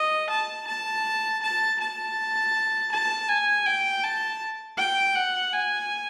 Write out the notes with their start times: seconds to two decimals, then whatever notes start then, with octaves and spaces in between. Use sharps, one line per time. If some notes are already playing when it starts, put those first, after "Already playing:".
Already playing: D#5
0.30 A5
0.67 A5
1.43 A5
1.80 A5
2.92 A5
3.29 G#5
3.66 G5
4.03 A5
4.77 G5
5.15 F#5
5.53 G#5